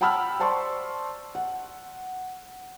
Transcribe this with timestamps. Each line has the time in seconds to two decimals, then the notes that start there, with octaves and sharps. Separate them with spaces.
0.01 F#5 G5 A5 B5 E6 F6
0.40 C5 D5 A5 C6 C#6
1.35 F#5